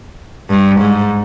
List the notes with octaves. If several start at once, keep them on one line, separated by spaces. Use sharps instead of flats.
G2
G#2